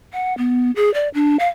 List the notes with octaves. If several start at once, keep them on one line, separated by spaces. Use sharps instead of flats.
F#5
B3
G#4
D5
D4
F5